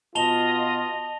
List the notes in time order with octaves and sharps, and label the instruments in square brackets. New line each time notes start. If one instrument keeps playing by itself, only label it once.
[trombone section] B2 F4 [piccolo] D#5 [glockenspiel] A5 F7 G7